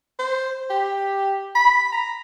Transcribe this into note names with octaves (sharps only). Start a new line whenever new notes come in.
C5
G4
B5
A#5